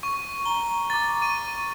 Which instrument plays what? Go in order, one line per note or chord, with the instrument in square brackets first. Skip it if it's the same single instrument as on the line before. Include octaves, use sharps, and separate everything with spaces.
[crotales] C#6
[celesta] A#5 [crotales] G7
[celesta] A#5 D6 [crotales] A6
[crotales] C#6 D#7